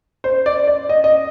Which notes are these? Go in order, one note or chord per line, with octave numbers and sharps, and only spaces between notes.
C5
D5
D5
D#5
D#5